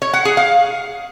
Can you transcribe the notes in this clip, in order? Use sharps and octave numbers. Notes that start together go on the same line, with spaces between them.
C#5
F#5
G#4
F5